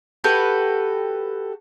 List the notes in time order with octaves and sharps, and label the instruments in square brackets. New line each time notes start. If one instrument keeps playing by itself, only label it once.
[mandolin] F#4 G4 A4 B4